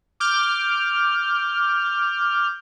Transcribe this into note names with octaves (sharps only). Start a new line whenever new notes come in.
D6 F6 G6